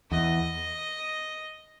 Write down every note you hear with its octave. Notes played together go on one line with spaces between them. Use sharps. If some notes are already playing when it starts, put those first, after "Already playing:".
E2 D#5